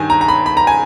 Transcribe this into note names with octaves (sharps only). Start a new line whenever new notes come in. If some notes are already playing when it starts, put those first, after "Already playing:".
Already playing: G2 D#3 G#5
A#5
A#5
B5
B5
A#5
G#5